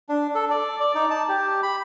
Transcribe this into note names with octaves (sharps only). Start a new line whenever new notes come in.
D4
A4
D5
D5
D#4
A5
G4
B5